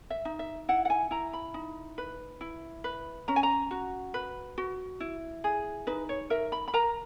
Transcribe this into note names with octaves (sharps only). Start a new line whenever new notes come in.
E5
D#4
E5
E4 F#5
F#5
G#5
E4 A#5
B5
D#4
B4
E4
B4
C#4 A#5
G#5
A#5
F#4
B4
F#4
E4
G#4
D#4 B4
C#5
A#4 E5
B5
B5
A#4 A#5